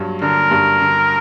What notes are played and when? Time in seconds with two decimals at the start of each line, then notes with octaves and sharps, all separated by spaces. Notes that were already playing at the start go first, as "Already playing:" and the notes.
Already playing: G2 F#3
0.22 D3 A#4
0.51 G2
0.81 D3